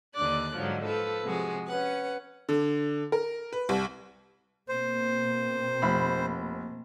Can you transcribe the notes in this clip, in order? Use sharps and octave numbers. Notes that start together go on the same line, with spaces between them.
D#2 D3 D4 D5 F#6
G#2 D3 F3 F#3
F3 A4 B4
C3 F3 G#3 F#4 G#4
C#4 B4 F#5
D3
A#4
B4
C2
B2 A#3 C4 C5
F1 B5